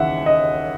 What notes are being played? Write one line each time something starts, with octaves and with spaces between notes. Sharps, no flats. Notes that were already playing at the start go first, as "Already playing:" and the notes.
Already playing: D#2 C#3 E3 E5 F#5
D#5